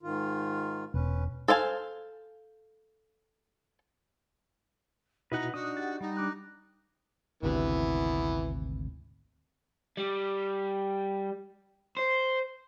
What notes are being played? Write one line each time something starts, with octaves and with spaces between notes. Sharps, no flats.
G#2 D#3 F4
E1 C#4 B4
A4 C5 F5 G#5
B2 D#4 E4 F#4 B4 D#5 F#5
D4 D#4 F#4 D#6
G4 F#5 A6
G3 D#4
D4 D6 F#6
G#1 D2 C3 E3 B3
G3
C5